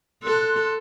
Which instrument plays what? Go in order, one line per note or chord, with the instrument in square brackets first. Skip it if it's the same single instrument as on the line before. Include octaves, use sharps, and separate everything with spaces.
[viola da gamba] A4 [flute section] C6 F#6